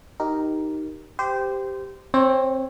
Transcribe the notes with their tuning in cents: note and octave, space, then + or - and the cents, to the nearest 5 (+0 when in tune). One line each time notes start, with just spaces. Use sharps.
D#4 +0 G4 -20 A#4 +0
G4 +0 C5 -20
C4 +15 C#5 -10